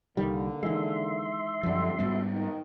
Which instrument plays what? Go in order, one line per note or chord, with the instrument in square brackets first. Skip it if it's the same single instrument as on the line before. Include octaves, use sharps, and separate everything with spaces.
[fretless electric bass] C2 D#3 G3 [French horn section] D3 A#3
[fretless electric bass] D#3 E3 G#3 [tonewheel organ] E5 C6
[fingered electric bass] F#2 F3 [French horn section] D3 G3
[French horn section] D2 B2 [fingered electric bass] G#2 G3 B3
[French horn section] D#3